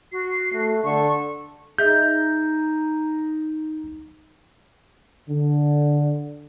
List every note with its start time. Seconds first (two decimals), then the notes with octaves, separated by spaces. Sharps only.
0.12 F#4 C7
0.53 A3
0.84 D3 A5 C#6
1.78 D#4 G#4 D#5 E5 G6
5.29 D3